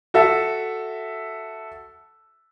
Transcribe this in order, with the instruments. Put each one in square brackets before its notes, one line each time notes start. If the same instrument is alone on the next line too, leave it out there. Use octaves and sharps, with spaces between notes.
[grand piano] F#4 A4 E5